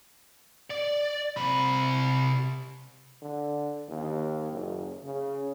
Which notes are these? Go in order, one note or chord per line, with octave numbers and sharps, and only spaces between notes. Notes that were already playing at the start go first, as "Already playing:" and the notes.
D5
C3 B5
D3
D#2
F#1
C#3